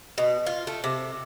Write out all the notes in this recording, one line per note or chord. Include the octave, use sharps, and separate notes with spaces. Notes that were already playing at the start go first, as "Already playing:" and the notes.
B2
F4
A3
C3